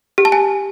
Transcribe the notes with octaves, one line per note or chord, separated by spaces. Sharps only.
G4
A5
G#5